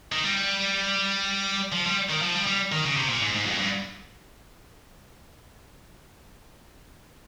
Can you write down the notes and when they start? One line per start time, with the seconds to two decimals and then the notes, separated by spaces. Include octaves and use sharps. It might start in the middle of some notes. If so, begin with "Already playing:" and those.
0.12 D#3
0.24 G3
1.72 F3
1.86 G3
2.10 D#3
2.22 F3
2.35 G3
2.47 G3
2.72 D#3
2.85 C#3
2.97 C3
3.09 A#2
3.22 G#2
3.35 G#2
3.46 F2
3.59 G2